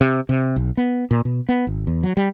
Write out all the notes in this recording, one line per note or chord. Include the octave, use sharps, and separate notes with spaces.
C3
C3
B1
B3
A#2
B2
B3
G#1
E2
F#3
G3